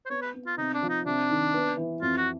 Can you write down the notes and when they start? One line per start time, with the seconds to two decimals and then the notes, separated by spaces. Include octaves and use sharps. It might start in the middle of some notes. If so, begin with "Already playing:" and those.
0.06 C5
0.10 B3 C#5
0.22 B4
0.34 B3
0.47 F4
0.58 C3 D#4
0.74 D4
0.82 F3
0.89 D#4
1.05 C3 D4
1.30 D#3
1.54 B3
1.77 E3
2.02 F2 F4
2.18 F#4